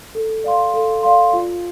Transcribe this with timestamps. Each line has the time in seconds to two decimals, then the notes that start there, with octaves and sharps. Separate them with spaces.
0.15 A4
0.44 D5 F5 C6
0.74 A4
1.03 D5 F5 C6
1.33 F4